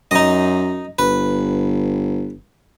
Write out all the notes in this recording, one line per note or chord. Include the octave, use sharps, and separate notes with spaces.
F#2 D#4 D#5
G1 B4